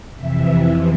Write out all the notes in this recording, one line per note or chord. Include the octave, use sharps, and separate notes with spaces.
F2 C3 E3 E5